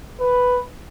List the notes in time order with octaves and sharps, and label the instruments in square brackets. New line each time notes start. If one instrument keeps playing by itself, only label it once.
[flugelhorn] B4